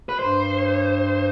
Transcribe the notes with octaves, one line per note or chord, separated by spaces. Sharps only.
B4
G2 C5